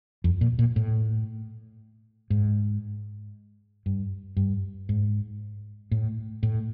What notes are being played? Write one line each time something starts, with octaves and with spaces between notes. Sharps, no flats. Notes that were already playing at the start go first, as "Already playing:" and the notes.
F2
A#2
A#2
A2
G#2
G2
G2
G#2
A2
A2